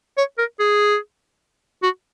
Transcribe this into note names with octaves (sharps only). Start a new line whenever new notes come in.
C#5
A#4
G#4
F#4